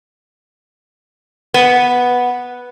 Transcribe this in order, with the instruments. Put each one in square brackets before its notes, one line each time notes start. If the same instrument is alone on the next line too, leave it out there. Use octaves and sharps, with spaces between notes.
[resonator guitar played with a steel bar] B3